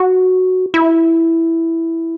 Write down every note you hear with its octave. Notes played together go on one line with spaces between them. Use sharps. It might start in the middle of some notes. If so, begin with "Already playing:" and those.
Already playing: F#4
E4